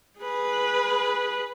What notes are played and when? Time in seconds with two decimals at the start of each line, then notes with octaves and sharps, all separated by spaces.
0.19 G#4 B4